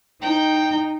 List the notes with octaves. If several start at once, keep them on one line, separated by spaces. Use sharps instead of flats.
D#4 G5